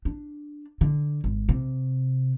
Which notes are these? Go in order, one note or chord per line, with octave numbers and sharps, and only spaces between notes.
D4
D3
G#1
C3